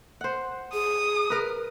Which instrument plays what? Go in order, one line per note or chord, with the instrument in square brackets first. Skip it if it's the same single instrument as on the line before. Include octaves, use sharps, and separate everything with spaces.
[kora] C5 F#5
[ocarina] G#4 [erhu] D#6
[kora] A#4 B4